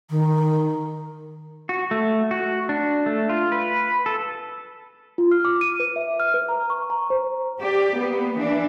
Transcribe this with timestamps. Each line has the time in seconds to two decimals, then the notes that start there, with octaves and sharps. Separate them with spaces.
0.10 D#3
1.69 F#4
1.91 A3
2.31 F#4
2.69 D4
3.06 A3
3.29 F4
3.52 B4
4.06 A4
5.18 F4
5.31 F6
5.45 D6
5.61 D#7
5.80 B4
5.96 E5
6.20 F6
6.34 B4
6.49 A#5
6.70 C#6
6.90 A#5
7.10 C5
7.61 G4 D5
7.96 A#3 B3
8.37 E3 D4